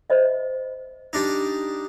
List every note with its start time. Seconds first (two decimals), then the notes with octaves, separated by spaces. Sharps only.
0.10 C5 D#5 E5
1.13 G3 D4 D#4